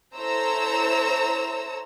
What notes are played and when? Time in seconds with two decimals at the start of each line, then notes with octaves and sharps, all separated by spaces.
0.16 E4 A4 C5 C#5 A#5 E6